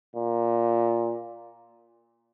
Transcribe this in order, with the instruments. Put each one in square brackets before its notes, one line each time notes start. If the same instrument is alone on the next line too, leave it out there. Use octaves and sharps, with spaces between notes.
[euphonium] A#2